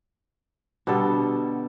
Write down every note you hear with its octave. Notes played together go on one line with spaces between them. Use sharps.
B2 D3 G3 A4